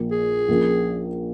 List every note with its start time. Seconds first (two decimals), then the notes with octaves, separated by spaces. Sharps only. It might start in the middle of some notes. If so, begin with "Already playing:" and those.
Already playing: A#1 A#2 A#3
0.12 G#4
0.48 A#1 A#2 A#3 C#4